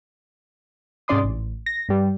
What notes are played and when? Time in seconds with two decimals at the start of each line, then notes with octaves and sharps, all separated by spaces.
1.08 G#2 C3 C#4 D5 C6 D#6
1.24 A1
1.66 A#6
1.89 G2 G3